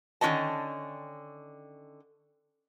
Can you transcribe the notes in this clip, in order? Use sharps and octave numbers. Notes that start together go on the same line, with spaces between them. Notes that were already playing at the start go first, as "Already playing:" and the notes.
D3 D#3 C#4 F#4 D#5 A5